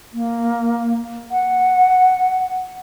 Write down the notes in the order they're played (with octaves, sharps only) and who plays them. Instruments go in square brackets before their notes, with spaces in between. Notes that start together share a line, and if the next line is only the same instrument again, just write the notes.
[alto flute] A#3
F#5